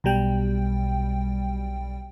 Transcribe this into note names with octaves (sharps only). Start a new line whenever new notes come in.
B1 B2 G3 G5